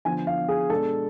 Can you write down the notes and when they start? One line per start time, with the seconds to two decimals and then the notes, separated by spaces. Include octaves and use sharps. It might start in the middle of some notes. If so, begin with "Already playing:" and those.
0.05 D3 F3 B3 G#5
0.27 F5
0.48 G#4
0.70 B2 G#3 D4 A4